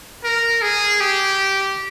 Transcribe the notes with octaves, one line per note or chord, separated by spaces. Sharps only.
A#4
G#4
G4